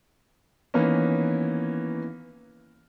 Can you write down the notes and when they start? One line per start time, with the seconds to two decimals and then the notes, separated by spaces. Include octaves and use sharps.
0.74 D#3 E3 A#3 B3 C#4